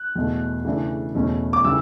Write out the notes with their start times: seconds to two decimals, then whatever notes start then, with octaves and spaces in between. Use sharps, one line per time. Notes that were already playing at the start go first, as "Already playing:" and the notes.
Already playing: F#6
0.15 E2 B2 A3
0.65 C#3 E3 A3 D4
1.15 E2 B2 A3 C#4
1.53 D6
1.64 C#3 E3 G3 E6